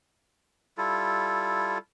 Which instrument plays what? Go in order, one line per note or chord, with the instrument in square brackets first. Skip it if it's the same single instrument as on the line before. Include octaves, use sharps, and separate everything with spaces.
[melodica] G3 E4 F4 A4